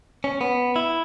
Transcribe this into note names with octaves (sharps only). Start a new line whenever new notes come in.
C#4
B3
E4